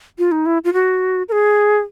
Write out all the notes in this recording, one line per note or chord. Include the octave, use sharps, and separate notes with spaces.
F4
D#4
E4
F4
F#4
A#4
G#4